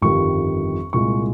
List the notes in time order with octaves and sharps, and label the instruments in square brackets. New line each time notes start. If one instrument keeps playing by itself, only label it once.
[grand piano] G1 F2 D#3 G3 C#6
C2 A#2 G#3 C#6